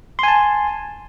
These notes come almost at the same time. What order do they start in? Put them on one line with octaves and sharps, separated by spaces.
C6 G#5 A5